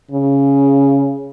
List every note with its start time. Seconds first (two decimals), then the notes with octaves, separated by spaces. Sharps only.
0.11 C#3